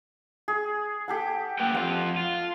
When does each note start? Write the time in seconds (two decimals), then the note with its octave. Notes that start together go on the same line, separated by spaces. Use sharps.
0.48 G#4
1.08 G4 A4 F#5
1.59 A#3 B4 G5
1.75 F2 F4 F#5
2.17 F4